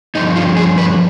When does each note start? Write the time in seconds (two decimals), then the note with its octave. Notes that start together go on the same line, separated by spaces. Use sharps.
0.15 G2 D3 F3 D#4
0.36 F4
0.57 G#4
0.77 B4